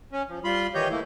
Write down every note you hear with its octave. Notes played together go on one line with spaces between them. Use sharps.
C#4
F3
G3 F4 B5 C6
D#3 E3 G4 C#5 D#5 G6
A3 A#3 E4